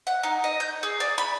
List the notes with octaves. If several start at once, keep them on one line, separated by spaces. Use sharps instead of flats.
F#5
D#4
D#5
G6
G#4
D5
B5